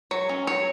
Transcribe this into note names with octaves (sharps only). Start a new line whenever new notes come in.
F#3 C#5
C#4
F#3 C#5